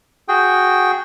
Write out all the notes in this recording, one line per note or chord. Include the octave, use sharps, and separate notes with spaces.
F#4 G#4 G5